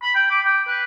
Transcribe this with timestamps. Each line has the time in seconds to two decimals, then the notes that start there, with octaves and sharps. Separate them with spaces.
0.02 B5
0.15 G5
0.31 D6
0.45 G5
0.68 B4